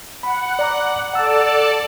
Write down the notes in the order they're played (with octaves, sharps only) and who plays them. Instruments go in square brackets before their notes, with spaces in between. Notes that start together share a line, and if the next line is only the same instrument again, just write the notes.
[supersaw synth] F#5 [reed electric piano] B5
[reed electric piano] D5 A#5 D6
[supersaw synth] A4 D5 A5 [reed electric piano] F#5 E6